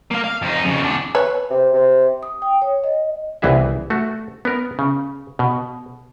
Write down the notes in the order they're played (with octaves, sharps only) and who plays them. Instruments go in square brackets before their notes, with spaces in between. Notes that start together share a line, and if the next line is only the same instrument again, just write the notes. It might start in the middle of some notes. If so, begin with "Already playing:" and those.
[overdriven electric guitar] A#3 F5
F5
F2 D#4
F2 C#3
E2 D4
[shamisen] B4 C#5
[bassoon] C3
C3
[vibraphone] D#6
G5
C#5
D#5
[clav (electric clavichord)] C2 E3 B3 G#4 E5
A3 F#4
B3 A#4
C#3
B2